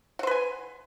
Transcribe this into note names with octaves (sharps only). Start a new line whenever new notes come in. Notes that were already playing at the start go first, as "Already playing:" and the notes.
B4 C5 F#5 G#5